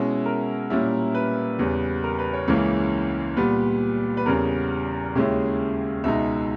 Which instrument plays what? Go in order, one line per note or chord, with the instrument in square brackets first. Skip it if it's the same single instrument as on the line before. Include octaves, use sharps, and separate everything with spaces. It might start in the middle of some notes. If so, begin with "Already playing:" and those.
Already playing: [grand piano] B2 G#3 C#4 E4
A#4
A#2 G3 C#4 E4
B4
E2 C#3 G3
A#4
B4
C#5
C#2 C#3 E3 A#3 C#4
A#2 G3 B3 B4
B4
E2 C#3 G3 A#4
D#2 C#3 G#3 C#4 E4 G4
C#2 B2 G#3 D#4 E5